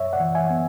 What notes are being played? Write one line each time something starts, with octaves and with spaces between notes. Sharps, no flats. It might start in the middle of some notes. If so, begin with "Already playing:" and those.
Already playing: F#2 C#5 E5
D5 F#5
E3
E5 G#5
B3